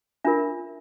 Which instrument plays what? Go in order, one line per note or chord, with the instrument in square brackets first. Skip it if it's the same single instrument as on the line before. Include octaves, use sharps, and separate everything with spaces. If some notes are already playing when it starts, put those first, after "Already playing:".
[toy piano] D4 F4 A#4 E5